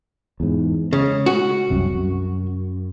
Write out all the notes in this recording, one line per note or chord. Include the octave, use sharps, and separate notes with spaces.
E2 G#2
C#3 G#3
F#4
C2 F#2 C3
F#2